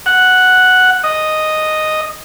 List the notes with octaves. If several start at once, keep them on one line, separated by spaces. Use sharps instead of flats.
F#5
D#5